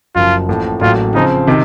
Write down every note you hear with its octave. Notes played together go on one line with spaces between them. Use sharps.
F#1 F#2 F3 F4
A1 A2 F3 A#3
A1 A2 F#3 A#3 F4
C#3 F3 C4 D#4
C3 D#3